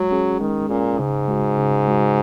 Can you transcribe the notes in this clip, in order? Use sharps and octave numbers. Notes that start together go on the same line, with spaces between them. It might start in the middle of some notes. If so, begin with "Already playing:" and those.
Already playing: F#3 G#3
C#4 G#4
D#3 G#3
A#2 C#4 G#4
G#2 C#3
G#3 F#4
C#3
G#3 F#4